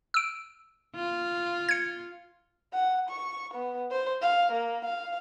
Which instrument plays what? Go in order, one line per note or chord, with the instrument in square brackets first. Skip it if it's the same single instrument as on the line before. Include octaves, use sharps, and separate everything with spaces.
[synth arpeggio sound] E6 D7
[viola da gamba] F4
[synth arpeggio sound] G#6 C#7
[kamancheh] F#5
C#6
B3
C5
F5
A#3
F5